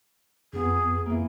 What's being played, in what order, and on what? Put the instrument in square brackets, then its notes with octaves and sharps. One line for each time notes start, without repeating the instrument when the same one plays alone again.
[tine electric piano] F2 B3 [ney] G#4
[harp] E3 A#3